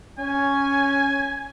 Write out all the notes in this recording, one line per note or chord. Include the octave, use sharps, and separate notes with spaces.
C#4 G#5